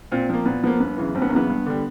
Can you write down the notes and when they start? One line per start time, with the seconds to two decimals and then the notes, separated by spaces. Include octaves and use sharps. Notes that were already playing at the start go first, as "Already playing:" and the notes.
0.12 A#2 C4
0.29 F3 A#3
0.45 A#2 B3
0.63 F3 A#3 B3
0.80 G1 B3
0.97 F#2 C#3 E3
1.15 G1 C4
1.22 B3
1.29 A#3
1.32 F#2 C#3 E3 B3
1.49 G2
1.66 D3 G3